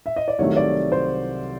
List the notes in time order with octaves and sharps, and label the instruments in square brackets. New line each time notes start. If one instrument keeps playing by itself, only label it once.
[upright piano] E5
D#5
D5
C2 C3 D#3 F#3 A3 C#5
D5
C5